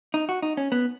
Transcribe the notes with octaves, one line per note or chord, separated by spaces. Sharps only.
D#4
F#4
D#4
C#4
B3